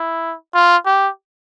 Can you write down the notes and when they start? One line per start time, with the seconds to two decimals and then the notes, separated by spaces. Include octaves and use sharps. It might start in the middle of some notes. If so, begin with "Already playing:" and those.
Already playing: E4
0.54 F4
0.86 G4